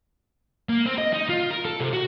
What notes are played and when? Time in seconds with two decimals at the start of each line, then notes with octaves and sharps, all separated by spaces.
0.69 A#3
0.86 C4
0.98 D#5
1.13 D#4
1.29 F4
1.51 A#4
1.65 A4
1.81 C3
1.93 F#4